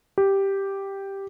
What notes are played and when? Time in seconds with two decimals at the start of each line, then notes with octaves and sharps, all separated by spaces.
0.18 G4